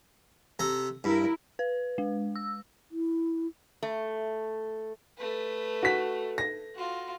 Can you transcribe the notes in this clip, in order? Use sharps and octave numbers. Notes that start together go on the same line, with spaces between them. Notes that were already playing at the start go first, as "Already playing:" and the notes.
C3 A4 A#5
G2 E4 A#4
B4
G#3
E6
E4
A3
A3 B4
F#4 B6
A#6
F4 F#4